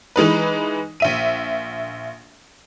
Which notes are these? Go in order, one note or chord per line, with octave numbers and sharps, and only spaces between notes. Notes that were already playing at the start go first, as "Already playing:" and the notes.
E3 G#3 D#4 B4
A#1 E5 D#7